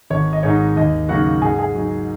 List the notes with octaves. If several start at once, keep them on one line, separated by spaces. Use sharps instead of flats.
G#1 C#5
D#5
G#2 G#3 D#4 C#5
D#2 D#5
C#3 F#3 A#3 D#4 F#4 F#5
G#2 G#4 G#5
G#4 G#5
F#3 D#4